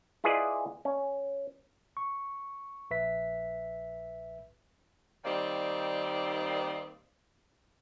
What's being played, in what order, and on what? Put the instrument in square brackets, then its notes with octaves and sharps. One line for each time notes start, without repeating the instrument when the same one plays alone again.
[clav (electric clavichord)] E4 F4 G#4 B4 D5 D#5
C#4
[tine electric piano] C#6
A#1 B4 E5 B6
[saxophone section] D#3 G3 A#3 C4 D#4 D5